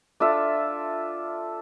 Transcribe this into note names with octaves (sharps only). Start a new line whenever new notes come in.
D4 F4 A4 E5